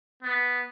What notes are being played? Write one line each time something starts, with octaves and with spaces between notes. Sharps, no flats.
B3